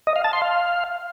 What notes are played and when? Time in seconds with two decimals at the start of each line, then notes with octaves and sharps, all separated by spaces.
0.07 D#5
0.16 F5
0.24 A5
0.33 C6
0.42 F5